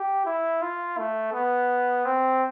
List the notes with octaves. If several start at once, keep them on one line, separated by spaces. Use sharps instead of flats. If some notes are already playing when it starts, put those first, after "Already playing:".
Already playing: G4
E4
F4
A3
B3
C4